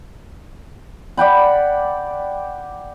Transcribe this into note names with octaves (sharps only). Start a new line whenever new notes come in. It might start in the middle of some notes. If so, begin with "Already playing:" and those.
D5 F#5 G5 B5